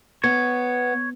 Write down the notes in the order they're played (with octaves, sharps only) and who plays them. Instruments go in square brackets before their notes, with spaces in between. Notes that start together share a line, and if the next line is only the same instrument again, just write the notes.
[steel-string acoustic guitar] B3 [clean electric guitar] C#5